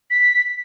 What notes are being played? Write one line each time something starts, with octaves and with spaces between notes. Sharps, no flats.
B6